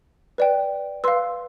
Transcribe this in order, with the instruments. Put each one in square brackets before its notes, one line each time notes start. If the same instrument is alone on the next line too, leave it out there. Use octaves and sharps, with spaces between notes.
[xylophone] B4 D5 G5
B4 F5 C6 E6